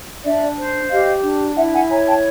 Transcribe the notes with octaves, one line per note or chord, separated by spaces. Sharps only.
D4 D5 E5
C5
G4 D#5 F5
D4
E4 E5 F#5
F#5 G#5
C#5 G#5 A#5
G5 A5